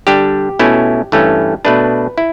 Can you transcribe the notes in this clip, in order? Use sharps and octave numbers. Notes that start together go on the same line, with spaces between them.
D3 G3 D4 G4
B2 A3 C#4 E4
G2 E3 A3 C#4
B2 A3 D4 B4
E4